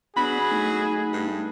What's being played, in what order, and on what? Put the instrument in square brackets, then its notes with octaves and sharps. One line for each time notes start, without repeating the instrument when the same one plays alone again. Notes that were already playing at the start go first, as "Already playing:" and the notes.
[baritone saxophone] F#3 [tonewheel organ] B3 D4 [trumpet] G#4 [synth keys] B5
[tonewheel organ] A3 D#4
[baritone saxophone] G2